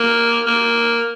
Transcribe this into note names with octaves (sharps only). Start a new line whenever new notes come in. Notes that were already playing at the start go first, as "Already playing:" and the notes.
Already playing: A#3
A#3